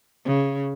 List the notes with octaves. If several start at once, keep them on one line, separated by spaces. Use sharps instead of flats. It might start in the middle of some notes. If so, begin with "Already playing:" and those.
C#3